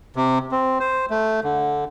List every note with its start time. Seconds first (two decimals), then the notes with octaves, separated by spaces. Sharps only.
0.16 C3
0.52 C4
0.80 C5
1.10 A3
1.44 D3